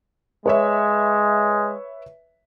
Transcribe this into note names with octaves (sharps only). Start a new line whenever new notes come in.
G#3 B4 C#5 E5